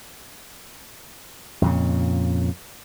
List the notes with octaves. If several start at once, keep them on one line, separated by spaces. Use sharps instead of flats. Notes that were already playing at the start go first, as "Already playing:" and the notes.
F2 A#2 C#3